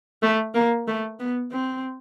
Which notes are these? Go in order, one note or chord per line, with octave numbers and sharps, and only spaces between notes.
A3
A#3
A3
B3
C4